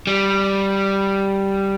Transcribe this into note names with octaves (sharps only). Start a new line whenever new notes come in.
G3